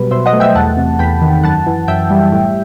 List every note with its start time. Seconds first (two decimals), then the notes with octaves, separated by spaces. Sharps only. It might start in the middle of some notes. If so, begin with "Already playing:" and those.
Already playing: B2 F#3 G3 B4
0.11 B2 C5 E5
0.26 D#5 F#5
0.33 A3
0.40 E5 G5
0.55 E2 F#5 A5
0.77 C3
0.99 E2 G5 B5
1.22 D#3
1.43 F#2 F#5 A5
1.67 E3
1.88 F#2 E5 G5
2.10 G3
2.32 A2